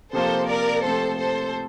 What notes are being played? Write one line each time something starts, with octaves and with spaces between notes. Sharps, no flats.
C3 F3 A#3 F4 A4 C5
A#4 D5
C3 F3 A3 C4 A4 C5
A4 C5